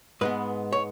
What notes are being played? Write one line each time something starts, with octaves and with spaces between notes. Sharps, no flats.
G#2 G#3 B3 B4
C#5